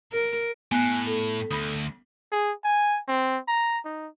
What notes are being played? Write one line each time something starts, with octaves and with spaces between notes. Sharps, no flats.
A#4
A2 B3 G#5 F#6
A4
D2 B5 D#6
G#4
G#5
C4
A#5
D#4